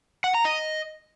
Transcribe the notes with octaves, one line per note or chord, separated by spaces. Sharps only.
F#5
A#5
D#5